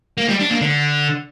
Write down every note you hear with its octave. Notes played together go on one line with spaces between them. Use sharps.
A#3
G3
D4
A#3
D3